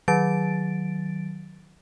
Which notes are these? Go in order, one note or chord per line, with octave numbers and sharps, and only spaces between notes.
D#3 F#3 A6 D7